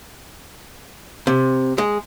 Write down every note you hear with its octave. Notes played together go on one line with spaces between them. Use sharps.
C3
G#3